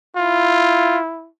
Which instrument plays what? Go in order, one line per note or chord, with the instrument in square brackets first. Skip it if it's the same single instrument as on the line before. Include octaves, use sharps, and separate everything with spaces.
[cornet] E4 [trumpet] F4